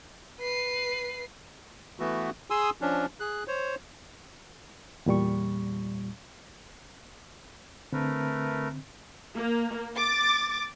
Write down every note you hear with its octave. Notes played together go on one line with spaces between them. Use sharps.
B4 C7
E3 A3 B3 F#4
G#4 G#5 C6 D#6 E6
F3 C#4 D4
G#4 F#6
C5 C#5
E2 A#2 G3 C#6
D3 A3 C4 A#4 B4
A#3
D6 A6